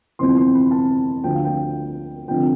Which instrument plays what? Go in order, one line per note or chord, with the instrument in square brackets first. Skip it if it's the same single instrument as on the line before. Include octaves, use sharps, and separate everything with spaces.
[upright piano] G1 F2 C3 E3 C6
C6
B5
A5
D2 D3 F3 G5
F5
G5
F1 F2 D3 F3 G5